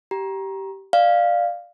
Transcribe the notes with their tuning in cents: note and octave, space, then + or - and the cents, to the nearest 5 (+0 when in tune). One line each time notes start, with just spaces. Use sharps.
G4 -15 A#5 +20
D5 +20 F5 +0